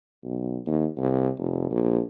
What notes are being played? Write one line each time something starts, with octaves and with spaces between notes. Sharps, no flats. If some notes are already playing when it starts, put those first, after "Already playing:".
B1
D#2
C2
F1
A#1